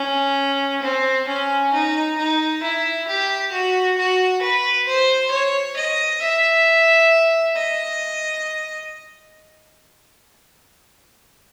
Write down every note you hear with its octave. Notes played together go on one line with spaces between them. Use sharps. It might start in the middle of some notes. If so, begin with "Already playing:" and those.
Already playing: C#4
C4
C#4
D#4
D#4
E4
G4
F#4
F#4
B4
C5
C#5
D#5
E5
D#5